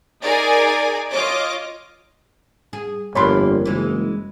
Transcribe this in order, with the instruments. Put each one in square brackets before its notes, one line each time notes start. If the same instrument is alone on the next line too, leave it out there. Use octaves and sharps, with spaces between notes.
[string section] D#4 G#4 A#4 D5 G#5
F4 C#5 D#5 D6
[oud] G#4
[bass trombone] G1 [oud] F2 A#3 D4 [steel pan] C#5 B5 C6
[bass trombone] F#1 [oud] E3 G#3